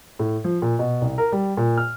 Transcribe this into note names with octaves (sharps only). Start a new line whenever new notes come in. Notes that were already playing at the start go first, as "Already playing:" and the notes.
A2
F3
A#2
B2
C2
A#4
G3
A#2
F6